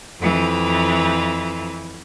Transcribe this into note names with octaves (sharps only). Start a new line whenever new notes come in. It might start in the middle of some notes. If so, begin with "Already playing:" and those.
F2 E3